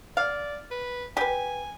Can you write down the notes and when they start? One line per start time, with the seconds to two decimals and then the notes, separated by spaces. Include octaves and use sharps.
0.17 D5 F5
0.71 B4
1.17 G4 B4 G#5